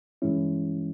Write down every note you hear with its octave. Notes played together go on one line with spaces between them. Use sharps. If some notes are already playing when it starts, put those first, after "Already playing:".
G2 E3 G#3 C#4 E4